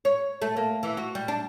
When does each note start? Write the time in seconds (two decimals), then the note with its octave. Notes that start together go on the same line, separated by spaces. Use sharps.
0.05 C#5
0.42 A3
0.57 A#3
0.83 E3
0.97 F#4
1.15 G3
1.28 D4